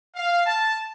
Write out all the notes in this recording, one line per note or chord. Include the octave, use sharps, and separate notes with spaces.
F5
A5